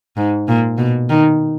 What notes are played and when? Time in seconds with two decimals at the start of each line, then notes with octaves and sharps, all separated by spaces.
0.17 G#2
0.48 A#2
0.78 B2
1.10 D#3